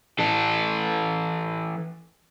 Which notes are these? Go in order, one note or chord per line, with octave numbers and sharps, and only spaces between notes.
E3 A4